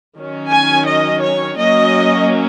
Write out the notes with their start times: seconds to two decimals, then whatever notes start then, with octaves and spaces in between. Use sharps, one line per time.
0.16 D#3 F#3 C#4
0.52 G#5
0.87 D#5
1.22 C#5
1.58 F#3 A#3 C#4 D#5